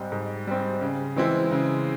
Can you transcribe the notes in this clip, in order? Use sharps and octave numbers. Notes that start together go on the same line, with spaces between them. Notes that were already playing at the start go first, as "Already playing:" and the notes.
Already playing: G#2 G3 C4
G#2
G3 C4
C#3
E3 G#3 C4 E4
C#3